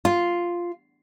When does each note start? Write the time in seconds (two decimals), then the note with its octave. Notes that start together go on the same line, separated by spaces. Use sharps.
0.05 F4